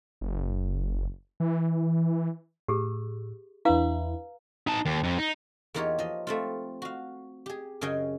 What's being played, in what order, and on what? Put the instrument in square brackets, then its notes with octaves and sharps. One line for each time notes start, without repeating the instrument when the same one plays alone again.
[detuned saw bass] F#1
E3
[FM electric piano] A2 [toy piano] G4 G#4
[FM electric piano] E2 D4 E4 [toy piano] B4 F5 A#5
[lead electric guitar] D#4 A5
D#2
F2
D#4
[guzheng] E2 A#3 D#4 F4 G4 C#5
F3 D#5
A3 C4 F4
F#4 F5
G4 G#4
F#2 C#3 G#4 D#5 G5 G#5